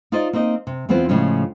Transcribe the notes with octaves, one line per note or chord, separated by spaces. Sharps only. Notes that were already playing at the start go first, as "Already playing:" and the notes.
D#4 F4 C5 D5 D#5
A#3 C4 D#4 D#5
C3
E2 E3 B3 C4 F4 C5
A2 C#3 F3 G#3 C#4 F4